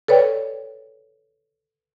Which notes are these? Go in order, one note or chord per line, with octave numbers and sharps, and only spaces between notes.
A4 B4 C#5 D5 G5